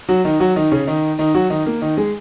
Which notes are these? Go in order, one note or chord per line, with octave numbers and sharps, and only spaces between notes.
F#3 F#4
D#3 D#4
F#3 F#4
D#3 D#4
C#3 C#4
D#3 D#4
D#3 D#4
F#3 F#4
D#3 D#4
A#3
D#3 D#4
G#3 G#4